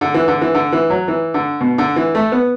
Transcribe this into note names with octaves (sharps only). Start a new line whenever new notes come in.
D3
E3
D3
E3
D3
E3
F#3
E3
D3
B2
D3
E3
A3
B3